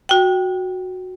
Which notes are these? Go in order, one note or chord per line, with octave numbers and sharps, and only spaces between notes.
F#4 G5